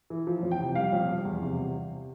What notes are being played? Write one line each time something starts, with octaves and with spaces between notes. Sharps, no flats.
E3
F3
F2
G5
C3
G3 F5
F2
G3
E2
C3